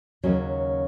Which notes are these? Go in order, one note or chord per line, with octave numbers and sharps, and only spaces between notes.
D#2 C#3 F#3 C#4